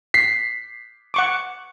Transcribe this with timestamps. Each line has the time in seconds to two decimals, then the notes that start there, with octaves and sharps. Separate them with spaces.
0.14 B6 C7
1.14 F#5 C#6 D6